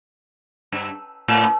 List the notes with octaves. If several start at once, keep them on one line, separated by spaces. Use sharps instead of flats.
G2
A2